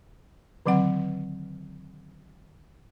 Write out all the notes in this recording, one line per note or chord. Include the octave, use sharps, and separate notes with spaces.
D3 D#3 F#3 C4 F#5